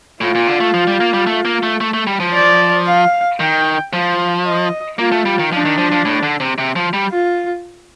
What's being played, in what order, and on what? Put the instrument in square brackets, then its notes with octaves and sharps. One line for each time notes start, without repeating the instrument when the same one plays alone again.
[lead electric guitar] A2 [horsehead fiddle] F4
[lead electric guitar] A#2
D3
A3
F3
G3
A#3
G3
A3
A#3
A3
A3
A3
G3
F3
[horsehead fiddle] D5
F5
[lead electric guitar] D#3 [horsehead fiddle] G5
[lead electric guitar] F3 [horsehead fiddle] F5
[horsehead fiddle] D#5
[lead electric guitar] A#3 [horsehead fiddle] F4
[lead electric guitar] A3
G3
D#3
[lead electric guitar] F3 [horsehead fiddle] D4
[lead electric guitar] D#3
F3
F3
A2
D3
C3
C3
F3
G3
[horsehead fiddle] F4